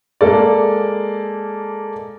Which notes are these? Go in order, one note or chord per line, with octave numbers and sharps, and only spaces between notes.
G#3 A#3 A4 D5